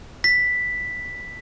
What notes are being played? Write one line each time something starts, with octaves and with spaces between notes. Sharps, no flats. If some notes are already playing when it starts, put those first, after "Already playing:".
B6